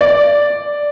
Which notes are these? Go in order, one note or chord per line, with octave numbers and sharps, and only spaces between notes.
D5